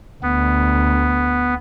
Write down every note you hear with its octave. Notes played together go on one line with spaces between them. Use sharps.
D2 B3